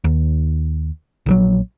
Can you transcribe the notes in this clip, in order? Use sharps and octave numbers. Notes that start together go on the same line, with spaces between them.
D#2
A#1 D#3 F#3